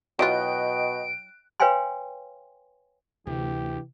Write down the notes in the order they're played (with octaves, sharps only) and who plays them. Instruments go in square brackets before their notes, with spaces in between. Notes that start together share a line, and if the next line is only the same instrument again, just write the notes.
[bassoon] B2 [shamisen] F#3 E4 F4 [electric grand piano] D#5 G5 F#6 [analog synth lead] D7
[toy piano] B4 C#5 F5 G5 G#5 C6
[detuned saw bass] D2 [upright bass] C3 [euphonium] E3 [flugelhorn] G4